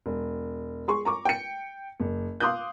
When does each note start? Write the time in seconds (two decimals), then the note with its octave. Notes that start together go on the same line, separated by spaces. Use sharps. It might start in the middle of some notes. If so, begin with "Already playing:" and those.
0.06 E1
0.88 G#4 C6 C#6
1.05 A#5 C#6 D6
1.25 G5 C#7
2.00 F#1
2.40 F5 C6 D6 D#6 F#6 G6